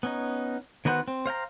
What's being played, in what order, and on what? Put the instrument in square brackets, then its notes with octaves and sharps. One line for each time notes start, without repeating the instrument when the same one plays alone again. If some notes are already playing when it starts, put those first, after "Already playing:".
[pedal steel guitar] B3 C#4 D#4
D#3 B3 F#4 B4 C5
C4
C5 F5 G5 A#5